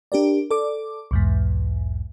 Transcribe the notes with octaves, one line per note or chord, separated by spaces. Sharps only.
D4 G4 A#4 D5
A4 D5 D6
B1 E2 G#2